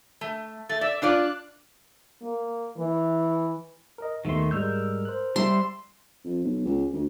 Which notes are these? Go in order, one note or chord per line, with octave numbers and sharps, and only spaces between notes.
A3
A3 A6
D5 E5
D4 F4 D5 F#6
A#3
E3
A#4 D#5
D#2 D#3 A3 B3 C6
G#2 G3 G#3 A#4 E6 G6
C5 F#6
G3 E5 C6
F2
B1
C#2
D2